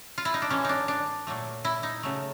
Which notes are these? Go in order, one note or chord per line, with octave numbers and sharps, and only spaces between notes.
F4
E4
D#4
D4
A2 E3 G#3 C#4
D4 D#4
D4
A#2 F#3 A3
E4
D#4
C#3 F#3 A3